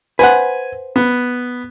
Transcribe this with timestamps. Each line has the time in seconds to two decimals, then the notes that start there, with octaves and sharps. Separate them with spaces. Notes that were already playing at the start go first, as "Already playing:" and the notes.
0.19 B4 C5 F#5 G#5
0.96 B3